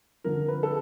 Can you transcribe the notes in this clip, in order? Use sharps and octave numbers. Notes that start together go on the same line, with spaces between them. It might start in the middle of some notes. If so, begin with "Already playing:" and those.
F2 D3 F3 A#4
B4
A4